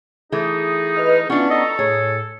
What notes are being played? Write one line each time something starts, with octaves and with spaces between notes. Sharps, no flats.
E3 A3 D#4 G#4
B4 D#5 F6
B3 C#4 D4 E4 F4 C#6
A4 D#5 A#5 C#6
A2 G#4 C#5